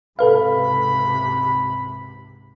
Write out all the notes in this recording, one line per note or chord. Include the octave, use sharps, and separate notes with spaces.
C#2 G#2 C3 A4 B4 F5 B5